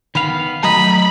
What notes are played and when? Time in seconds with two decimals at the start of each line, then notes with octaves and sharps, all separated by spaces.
0.15 D#3 B3 F5 B5
0.63 F#3 A3 D#5 A#5 B5